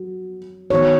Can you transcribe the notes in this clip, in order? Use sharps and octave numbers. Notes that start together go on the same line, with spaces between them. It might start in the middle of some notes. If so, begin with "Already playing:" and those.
Already playing: F#3 F#4
D#3 B3 F#4 C#5